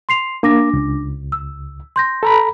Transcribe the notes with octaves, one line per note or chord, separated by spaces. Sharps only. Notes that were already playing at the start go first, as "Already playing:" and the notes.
C6 C7 F7
A#3 D4 D6 A#6
C#2
E6
C6 G6 A#6
A4 A#5 B5